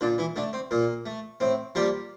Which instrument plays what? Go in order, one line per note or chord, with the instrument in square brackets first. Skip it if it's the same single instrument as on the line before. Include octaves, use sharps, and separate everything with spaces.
[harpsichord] A#2 D3 D4
E3 E4
D3 A3 D4
C4
A#2 A#3
A3
A2 C4
F3 G3 A#3 G4